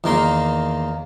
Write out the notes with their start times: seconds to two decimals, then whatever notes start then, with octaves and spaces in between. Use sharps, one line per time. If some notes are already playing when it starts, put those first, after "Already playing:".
0.04 E2 D#3 A#3 C6